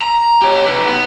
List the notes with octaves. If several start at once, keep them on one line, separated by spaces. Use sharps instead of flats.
A#5
G4 C#5
D#4 B4
B3